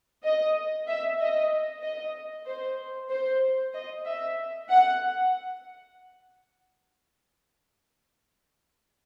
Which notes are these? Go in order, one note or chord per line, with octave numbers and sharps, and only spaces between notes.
D#5
E5
D#5
D#5
C5
C5
D#5
E5
F#5